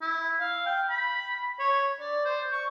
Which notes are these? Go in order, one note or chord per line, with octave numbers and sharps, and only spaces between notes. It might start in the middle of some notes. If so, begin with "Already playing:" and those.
E4
F5
G5
B5
C#5
D5
C5
C#6